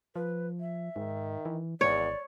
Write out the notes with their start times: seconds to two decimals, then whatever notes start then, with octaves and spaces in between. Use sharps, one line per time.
0.16 F3 B4
0.60 E5
0.96 G#2 D#3
1.45 E3
1.81 G#1 E2 C#5 D5